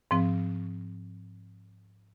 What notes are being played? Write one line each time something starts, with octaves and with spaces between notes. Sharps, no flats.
G#2 F3 C4